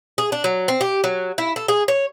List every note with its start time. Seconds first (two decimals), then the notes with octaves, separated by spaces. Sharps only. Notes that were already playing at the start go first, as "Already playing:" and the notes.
0.18 G#4
0.32 D4
0.44 F#3
0.68 C4
0.81 G4
1.04 F#3
1.38 E4
1.56 A4
1.68 G#4
1.88 C#5